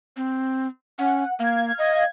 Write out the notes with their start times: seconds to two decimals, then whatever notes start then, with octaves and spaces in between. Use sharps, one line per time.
0.17 C4
0.99 C#4 F#5
1.39 A#3 F5 G#6
1.79 D#5